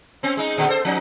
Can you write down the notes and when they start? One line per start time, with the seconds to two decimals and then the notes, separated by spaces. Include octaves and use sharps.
0.23 C4 C#4
0.37 G#3 D#4
0.57 A#2 D3
0.68 A4 C5
0.85 F3 C#4 D#4